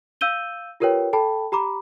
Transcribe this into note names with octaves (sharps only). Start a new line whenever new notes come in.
F5 E6 G6 D#7 G7
F4 G4 A#4 B4 C#5 G5
A4 G5 A5 B5
G4 A#5 B5 D6